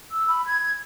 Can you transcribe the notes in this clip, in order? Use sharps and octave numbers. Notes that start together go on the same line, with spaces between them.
E6
B5
G#6